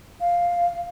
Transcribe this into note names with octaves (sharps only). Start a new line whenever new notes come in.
F5